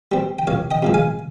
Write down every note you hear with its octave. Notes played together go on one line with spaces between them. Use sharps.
G3 C4
G5
C2 C#5 F5
D#5 G5
C3 F3 G#3
F5 G#5